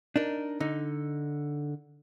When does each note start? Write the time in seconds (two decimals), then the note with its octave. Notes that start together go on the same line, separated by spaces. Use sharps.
0.16 D4 D#4 A#4
0.60 D3 D#4